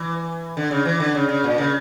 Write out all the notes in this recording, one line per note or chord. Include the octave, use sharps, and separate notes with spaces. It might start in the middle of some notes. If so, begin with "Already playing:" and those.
Already playing: E3
D3
C#3
E3
D3
C#3
C#3
A#2
C#3